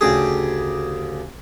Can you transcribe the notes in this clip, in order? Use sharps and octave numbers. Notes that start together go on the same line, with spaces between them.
D2 C#3 G4 G#4